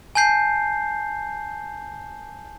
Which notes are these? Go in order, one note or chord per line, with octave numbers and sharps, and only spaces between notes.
G#5 A5 G6 C7